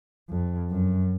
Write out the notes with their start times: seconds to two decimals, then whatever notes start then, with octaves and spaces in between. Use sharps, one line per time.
0.30 F2
0.71 F#2